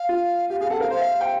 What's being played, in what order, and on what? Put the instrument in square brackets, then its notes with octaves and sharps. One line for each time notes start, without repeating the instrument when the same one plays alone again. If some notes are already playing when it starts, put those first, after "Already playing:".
Already playing: [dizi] F5
[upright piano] F4
[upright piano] G4 [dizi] F5
[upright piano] G#4 [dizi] F5
[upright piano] A4 [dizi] F#5
[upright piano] A#4 [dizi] F5
[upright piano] C5 [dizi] F5
[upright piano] E5
G5